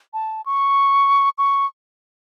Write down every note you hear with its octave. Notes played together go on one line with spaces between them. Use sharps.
A5
C#6
C#6